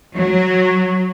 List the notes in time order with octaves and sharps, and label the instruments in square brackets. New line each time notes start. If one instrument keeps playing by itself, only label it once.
[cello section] F#3